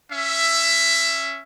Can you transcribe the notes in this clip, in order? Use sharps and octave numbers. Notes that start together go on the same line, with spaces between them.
C#4 E5